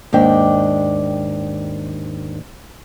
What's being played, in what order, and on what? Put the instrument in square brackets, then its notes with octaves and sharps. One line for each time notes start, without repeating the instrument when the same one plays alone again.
[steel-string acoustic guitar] D#2 G#2 D4 G5